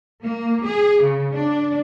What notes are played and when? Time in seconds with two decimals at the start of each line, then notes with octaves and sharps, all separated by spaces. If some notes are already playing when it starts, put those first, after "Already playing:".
0.21 A#3
0.65 G#4
1.02 C#3
1.33 D4